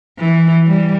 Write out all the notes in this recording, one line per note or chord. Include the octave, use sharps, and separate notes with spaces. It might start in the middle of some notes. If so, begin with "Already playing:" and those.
E3
G3